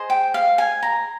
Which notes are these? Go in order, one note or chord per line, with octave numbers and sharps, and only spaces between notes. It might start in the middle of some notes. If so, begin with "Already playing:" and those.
Already playing: G#4 C5 D#5
G5
F5
G#5
A#5